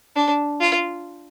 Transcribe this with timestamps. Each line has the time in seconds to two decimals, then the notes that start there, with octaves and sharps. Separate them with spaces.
0.16 D4
0.61 F4